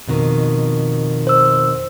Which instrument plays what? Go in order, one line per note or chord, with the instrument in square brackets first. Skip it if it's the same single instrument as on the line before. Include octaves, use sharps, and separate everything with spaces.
[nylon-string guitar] F2 B2 D#3
[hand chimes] C5 E6